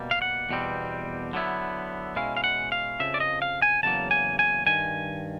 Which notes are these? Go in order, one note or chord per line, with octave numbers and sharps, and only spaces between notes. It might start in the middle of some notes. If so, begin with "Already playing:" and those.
Already playing: B2 G3 A#3
F5
F#5
E2 B2 G3 C4
D3 F#3 B3 E4
B2 G#3 C#4 E4 F5
F5
F#5
F5
F2 C#3 F3 E5
D5
D#5
F5
G#5
E2 C#3 F#3 A#3 A5
G#5
G#5
G2 D#3 G#5